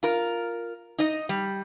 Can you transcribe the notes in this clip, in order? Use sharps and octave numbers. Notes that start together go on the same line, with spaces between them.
F4 A#4
D#4 D#5
G3